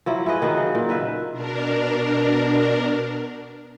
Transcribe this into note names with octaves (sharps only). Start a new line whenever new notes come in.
F3 F#3 E4
E4 G#4 B4 D#5
D#3 F#3 B3
C#3
A#2
D#3 B4 E5
B2 D4 A#4